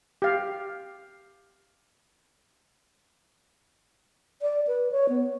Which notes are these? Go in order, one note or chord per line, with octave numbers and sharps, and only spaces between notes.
G4 F5
D5
B4
C#5
B3